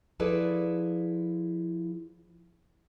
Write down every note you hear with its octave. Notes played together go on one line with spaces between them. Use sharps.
F3 E4 G#4 A4 B4 D5